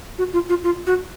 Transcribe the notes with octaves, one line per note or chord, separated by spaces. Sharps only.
F#4
F4
F4
F4
F#4